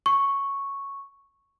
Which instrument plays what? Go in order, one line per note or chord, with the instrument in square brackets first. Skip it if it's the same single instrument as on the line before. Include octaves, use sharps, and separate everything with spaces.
[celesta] C#6